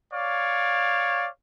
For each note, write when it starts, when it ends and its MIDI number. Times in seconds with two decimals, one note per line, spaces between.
0.13 1.27 73
0.13 1.27 74
0.13 1.27 77